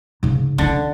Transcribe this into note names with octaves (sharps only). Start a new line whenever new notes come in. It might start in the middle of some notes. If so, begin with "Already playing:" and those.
G#2 C#3
D3 C#4 E4